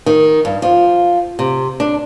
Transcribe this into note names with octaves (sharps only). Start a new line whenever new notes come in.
D#3
G2
F3
C3
D4